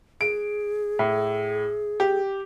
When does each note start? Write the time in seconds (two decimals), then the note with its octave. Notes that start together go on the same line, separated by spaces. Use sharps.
0.21 G#4 D7
0.99 A2
2.00 G4